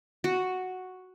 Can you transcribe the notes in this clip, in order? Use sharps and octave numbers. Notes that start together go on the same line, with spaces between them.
F#4